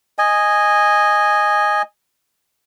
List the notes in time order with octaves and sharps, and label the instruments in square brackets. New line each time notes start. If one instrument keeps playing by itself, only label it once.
[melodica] D#5 G#5